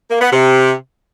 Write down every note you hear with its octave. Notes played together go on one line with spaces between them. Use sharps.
A#3
B3
C3